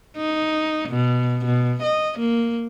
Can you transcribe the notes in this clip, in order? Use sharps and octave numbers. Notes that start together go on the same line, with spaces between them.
D#4
B2
B2
D#5
A#3